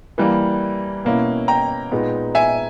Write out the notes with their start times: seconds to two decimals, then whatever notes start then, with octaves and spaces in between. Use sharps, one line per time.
0.18 E3 G3 A#3
1.05 B2 A#3 C#4 E4
1.48 G5 A#5
1.91 A#2 G#3 B3 D#4
2.35 E5 G#5